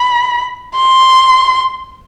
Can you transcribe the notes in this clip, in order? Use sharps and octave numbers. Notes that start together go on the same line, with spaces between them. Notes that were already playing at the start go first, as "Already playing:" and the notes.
Already playing: B5
C6